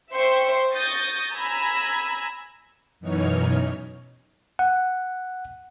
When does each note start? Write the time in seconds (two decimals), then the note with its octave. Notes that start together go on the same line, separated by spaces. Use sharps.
0.13 C5 E5 G5 C6 C#6
0.75 C#6 D#6 G6 A6 A#6
1.34 G#5 A#5 B5 E6 G#6
3.00 F#2 B2 E3 D#4 C#5 F6
4.59 F#5